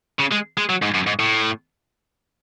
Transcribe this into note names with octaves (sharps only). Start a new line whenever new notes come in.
C#3
G#3
G#3
F#3
G#2
F#2
G#2
A2